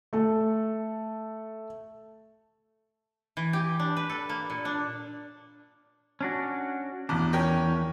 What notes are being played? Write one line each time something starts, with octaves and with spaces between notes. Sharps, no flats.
A3 A4
E3
G4
D4
B4
A4
A#3
A#2
D4
C#4 D4 F#4
A1 E2 D4
C#4 A#4 G5